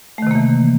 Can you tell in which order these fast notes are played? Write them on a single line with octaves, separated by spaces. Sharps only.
A3 D#3 C3 A#3 E3